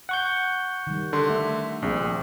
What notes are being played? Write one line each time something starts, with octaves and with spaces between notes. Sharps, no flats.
F#5 C#6 G6
D#3 G3
D3 C6
A3 E5
A#1 G3 C4 G#4